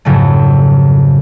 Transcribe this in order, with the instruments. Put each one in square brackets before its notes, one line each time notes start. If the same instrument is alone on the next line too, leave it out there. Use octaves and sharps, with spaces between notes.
[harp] F2 G#2 C#3 F3 F#3 A3